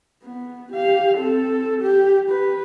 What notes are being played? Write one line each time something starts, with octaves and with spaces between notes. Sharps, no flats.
B3
G4 F5
C4 A4
G4
G4 B4